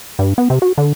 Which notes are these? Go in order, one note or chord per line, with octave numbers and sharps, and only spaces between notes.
G2
B3
C3
F#4
D3